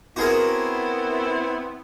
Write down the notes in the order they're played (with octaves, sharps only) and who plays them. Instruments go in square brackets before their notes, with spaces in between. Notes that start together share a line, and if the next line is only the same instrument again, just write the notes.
[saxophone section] B3 C4 E4 [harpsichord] F#4 G#4 A#4